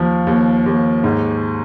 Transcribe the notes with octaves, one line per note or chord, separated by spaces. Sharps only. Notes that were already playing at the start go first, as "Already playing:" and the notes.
Already playing: D#2 F3
D#2
D#2
G#2